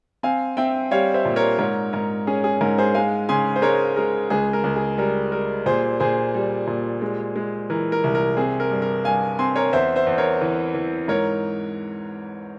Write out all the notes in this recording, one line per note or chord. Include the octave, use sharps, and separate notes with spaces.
C4 F5 G#5
C4 E5 G5
G3 C#5 F5
C5 E5
A#2
A#4 C#5
G#2 A#4 C#5
G#2 A#4
C#4 G#4
G#4
G#2 A#4
G#4 C5
G#3 F5 G#5
C#3 G#5 C6
C5
G#3 A#4 C#5
G#3 A#4
C#2 G#4
A#4
C#2
G#4
G3 A#4
G3 A#4
A#2 G#4 C5
A#2 G#4 C5
G3
A#2
G#3
G#3
E3 A#4
A#4
C2
A#4
C4 G#4
A#4
G2
A#4
G2 F5 G#5
C4 G#5 C6
A#4 C#5
E2 C5 E5
C5 E5
E2
A#4 C#5
E3
E3
G#2 A#4 C#5